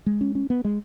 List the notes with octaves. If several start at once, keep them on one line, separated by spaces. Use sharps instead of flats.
G#3
C#4
C#4
B3
G#3